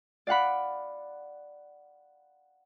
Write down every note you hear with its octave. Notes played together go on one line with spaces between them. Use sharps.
D5 F5 F#5 B5